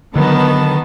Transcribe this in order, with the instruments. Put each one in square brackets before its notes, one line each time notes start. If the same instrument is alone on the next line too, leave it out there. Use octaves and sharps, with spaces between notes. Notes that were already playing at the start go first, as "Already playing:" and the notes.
[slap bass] D3 F#3 [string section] D#3 B3 A5